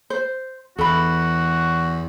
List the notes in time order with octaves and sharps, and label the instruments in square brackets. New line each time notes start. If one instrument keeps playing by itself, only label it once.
[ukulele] C5
[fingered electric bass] E2 [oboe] F#4 [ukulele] A4 B5